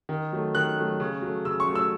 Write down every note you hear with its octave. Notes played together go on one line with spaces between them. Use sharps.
D#3
F#3 A3
D#3 F#6
F#3 A3
C#3
F#3 A3
C#3 E6
C#6
F#3 A3
E6